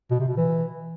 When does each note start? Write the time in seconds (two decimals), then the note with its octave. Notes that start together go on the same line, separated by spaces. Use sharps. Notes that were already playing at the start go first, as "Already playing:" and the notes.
0.11 B2
0.20 C3
0.28 B2
0.37 E3